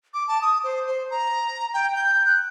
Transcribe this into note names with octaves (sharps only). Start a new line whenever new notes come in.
D6
A5
D#6
C5
C5
A#5
G5
G6
F#6